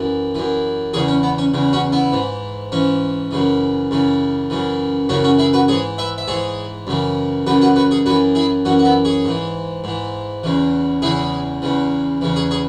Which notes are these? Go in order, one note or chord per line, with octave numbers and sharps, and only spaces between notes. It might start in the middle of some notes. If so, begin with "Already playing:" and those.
Already playing: F#2 E3
F#2 E3
E2 C#3 E3 G#4 C#5
C#4
B3
C#4
E2 C#3 E3
C#4 F#4
B3 E4
G#2 E3
G#2 E3 C#4
F#2 C#3 E3
F#2 C#3 E3
F#2 C#3 E3
F#2 C#3 E3 C#4 F#4
C#4 F#4
E4 G#4
F#4 B4
G#2 E3 G#4 C#5
B4 E5
E5
G#2 E3 G#4 C#5
F#2 C#3 E3
F#2 C#3 E3 F#4 B4
F#4 B4
F#4 B4
G#4 C#5
F#2 E3 F#4 B4
E4 G#4
F#2 E3 C#4 F#4
F#4
B3 E4
G#4 C#5
G#2 E3
G#2 E3
E2 C#3 E3
E2 C#3 E3 E4 G#4
E2 C#3 E3
E2 C#3 E3
G#4 C#5
G#4 C#5